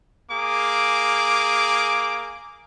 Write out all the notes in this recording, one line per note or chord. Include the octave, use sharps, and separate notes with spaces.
A#3 G#4 D6